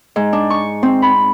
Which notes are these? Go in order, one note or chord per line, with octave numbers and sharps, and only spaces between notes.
G#2
D4
C#6
C4
B5